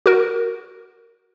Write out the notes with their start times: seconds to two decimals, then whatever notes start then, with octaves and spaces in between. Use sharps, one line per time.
0.06 F#4 A#4